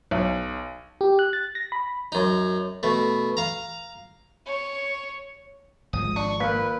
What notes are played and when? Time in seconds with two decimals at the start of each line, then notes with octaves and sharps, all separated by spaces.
0.11 B1
1.01 G4
1.19 F#6
1.33 A6
1.55 A#6
1.72 B5
2.12 F#2 D#4
2.83 B2 A3
3.37 F5 A#5
4.47 C#5
5.93 G#1 F3 G#3 D#6
6.16 D4 C#6
6.40 A#2 B4